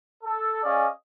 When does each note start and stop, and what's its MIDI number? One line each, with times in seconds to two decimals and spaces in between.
0.24 0.60 69
0.63 0.87 61
0.63 0.87 68
0.63 0.87 74
0.63 0.87 75
0.63 0.87 77